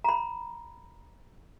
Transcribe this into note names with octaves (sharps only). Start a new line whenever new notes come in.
A#5 B5